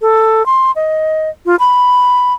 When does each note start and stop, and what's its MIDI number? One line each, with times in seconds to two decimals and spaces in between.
0.02 0.45 69
0.46 0.71 84
0.76 1.30 75
1.46 1.55 65
1.59 2.33 83